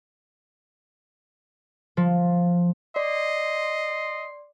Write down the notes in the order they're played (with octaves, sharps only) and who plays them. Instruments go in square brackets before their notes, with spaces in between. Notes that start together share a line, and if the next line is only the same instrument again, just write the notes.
[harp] F3
[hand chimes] D5 [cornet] D#5 [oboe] C6